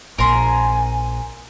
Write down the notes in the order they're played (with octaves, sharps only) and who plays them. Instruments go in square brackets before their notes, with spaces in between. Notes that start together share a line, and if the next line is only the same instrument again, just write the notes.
[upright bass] A#1 [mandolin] A#4 C6 [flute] G#5